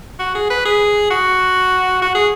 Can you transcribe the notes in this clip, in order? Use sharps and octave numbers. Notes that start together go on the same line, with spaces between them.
F#4
G#4
B4
G#4
F#4
F#4
G#4